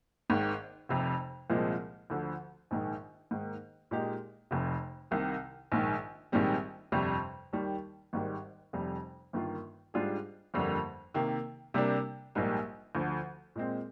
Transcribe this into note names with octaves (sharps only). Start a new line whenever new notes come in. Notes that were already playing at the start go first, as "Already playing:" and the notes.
G#1 G#2 D#3
F1 F2 C3
C2 A#2 F3 G#3 C4
D2 D3 F3
A#1 G#2 D#3
G#2 D#3 A#3
A#2 G#3 D#4 G4
F1 F2 C3
C2 C3 D#3
A#1 G#2 D#3
A#1 G#2 D#3 G3 C4
G1 F2 C3 G3
D#2 D#3 G3
G#1 G#2 D#3 G3
F1 F2 C3 G3
G1 G2 D#3 A#3 F4
G#2 G3 D4 F4 G#4
G1 F2 D3 G3 A#3
C3 D#3 A#3
C3 G3 A#3 D4
A#1 G#2 G3 A#3
D2 D3 F3
A#2 G#3 C4